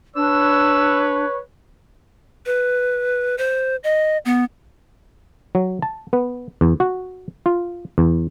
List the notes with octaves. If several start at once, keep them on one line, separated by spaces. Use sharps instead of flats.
D4 B4 C#5 E6
B4
C5
D#5
B3
F#3
A5
B3
E2
F#4
F4
E2